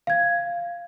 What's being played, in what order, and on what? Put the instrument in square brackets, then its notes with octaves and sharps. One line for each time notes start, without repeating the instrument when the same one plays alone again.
[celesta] F5 G#6